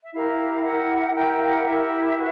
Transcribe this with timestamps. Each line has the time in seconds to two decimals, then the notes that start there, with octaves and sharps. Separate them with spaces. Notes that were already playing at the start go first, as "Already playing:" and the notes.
0.02 E5
0.12 E4 G4 A#4 F5
0.63 E4 G4 A#4 F#5
1.14 E4 G4 A#4 G5
1.31 G5
1.41 F5
1.48 F#5
1.64 E4 G4 A#4 E5
2.15 F#4 B4